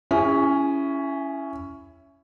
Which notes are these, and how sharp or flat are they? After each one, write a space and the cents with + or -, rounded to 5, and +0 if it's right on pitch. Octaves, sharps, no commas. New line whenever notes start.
C#4 +10 E4 +15 G#4 -35